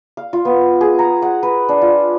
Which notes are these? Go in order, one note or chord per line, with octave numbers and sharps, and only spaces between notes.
F5
F4
B3
G#4
A#5
F#5
B4
D4
F4